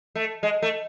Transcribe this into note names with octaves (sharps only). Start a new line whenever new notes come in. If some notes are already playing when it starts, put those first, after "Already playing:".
A3
G#3
A3